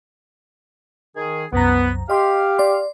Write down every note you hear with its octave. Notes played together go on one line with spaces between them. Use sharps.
D#3 G#4
C2 F#2 B3 A#5
G4 D#5 F5 C6
D5 C6